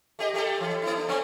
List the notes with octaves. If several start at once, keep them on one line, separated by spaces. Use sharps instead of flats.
A3 G4 D#5
A3 G4 A4
E3
A#3 E4
D4
D3 B3 C4